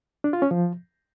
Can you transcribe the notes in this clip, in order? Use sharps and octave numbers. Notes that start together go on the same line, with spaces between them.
D4
F4
C#4
F3